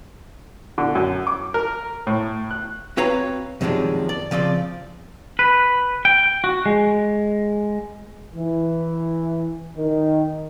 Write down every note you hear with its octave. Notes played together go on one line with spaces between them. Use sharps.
D3
F#2
D6
A#4
A2
F#6
C4 F#4 B4 C#5 F5 A#5
F#2 C3 D#3 F3 G#3 D4
D5
C#3 F3 C4 D5 C6
B4
G5
F#4
G#3
E3
D#3